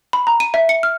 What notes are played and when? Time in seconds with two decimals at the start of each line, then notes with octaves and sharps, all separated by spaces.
0.13 B5
0.27 A#5
0.40 D#7
0.54 E5
0.69 C#7
0.83 F6